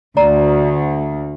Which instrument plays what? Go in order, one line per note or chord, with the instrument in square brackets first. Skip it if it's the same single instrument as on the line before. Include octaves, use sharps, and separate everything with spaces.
[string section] D2 [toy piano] D5 A#5